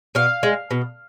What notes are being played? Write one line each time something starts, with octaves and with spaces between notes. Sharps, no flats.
B2 F5
G#3
B2